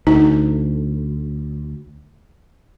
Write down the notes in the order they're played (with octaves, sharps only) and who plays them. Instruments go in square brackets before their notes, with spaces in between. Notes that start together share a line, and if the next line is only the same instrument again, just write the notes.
[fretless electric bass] D2 [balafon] D#4